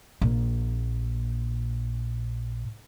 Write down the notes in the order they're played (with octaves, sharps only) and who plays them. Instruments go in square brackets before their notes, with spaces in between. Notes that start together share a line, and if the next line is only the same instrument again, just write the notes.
[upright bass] A#1 A#2